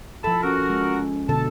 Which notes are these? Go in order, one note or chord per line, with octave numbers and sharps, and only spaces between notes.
F3 E4 A4 A5 B5
C#4 F#4 A#4
G#3
B2 D3 A4 A5